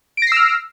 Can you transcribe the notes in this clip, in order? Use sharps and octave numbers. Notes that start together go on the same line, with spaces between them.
E6 F6 A#6 C7 D7